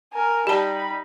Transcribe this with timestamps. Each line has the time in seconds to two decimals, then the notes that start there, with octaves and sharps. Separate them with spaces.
0.13 A#4 G#5
0.47 G3 D#4 G4 A5 B5